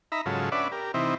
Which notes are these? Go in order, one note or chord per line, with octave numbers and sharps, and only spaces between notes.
D#4 E5 A#5 B5
G#2 C#3 F#3 F4 A4
C#4 D4 B4 D5 E5 F#5
G4 A#4
C3 E3 C4 D#4 E4